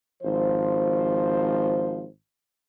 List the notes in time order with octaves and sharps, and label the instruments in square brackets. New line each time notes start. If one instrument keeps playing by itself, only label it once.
[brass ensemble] G#1 F3 C5